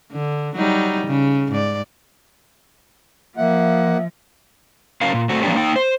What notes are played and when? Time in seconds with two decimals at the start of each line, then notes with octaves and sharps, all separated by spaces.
0.12 D3
0.55 F#3 G3 D#4
1.07 C#3
1.52 G#2 D5
3.37 F3 A#3 E5 F#5
5.01 F#3 C#4 A#4 F5
5.14 A#2
5.29 A3 C4 F#4
5.43 F3 A#3 B3 C#4 D4 G4
5.55 A#3 D#4 G5
5.76 C5